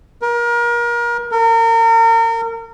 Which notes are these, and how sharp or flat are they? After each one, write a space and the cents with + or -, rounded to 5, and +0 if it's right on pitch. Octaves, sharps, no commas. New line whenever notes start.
A#4 +30
A#4 -35